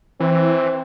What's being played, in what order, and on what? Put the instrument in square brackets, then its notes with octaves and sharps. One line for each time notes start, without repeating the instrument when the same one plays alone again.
[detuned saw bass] E3 [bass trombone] C4